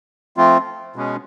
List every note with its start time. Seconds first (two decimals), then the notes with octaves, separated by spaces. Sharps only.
0.37 F3 A3 C4 F4
0.96 B2 G#3 C#4